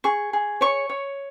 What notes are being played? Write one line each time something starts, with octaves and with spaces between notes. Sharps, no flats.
G#4 C#6
G#4
C#5 C#6
C#5